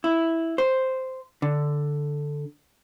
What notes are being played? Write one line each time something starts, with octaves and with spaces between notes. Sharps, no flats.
E4
C5
D3